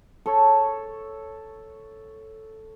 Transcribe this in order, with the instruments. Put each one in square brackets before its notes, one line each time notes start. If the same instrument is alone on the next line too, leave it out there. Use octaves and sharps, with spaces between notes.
[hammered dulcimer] A4 C#5